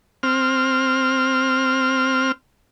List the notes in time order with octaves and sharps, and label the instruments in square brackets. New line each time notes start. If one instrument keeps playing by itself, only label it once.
[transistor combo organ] C4 F6